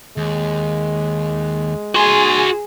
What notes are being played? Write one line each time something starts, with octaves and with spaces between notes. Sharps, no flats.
D#2 G#3
F#4 G#4 C6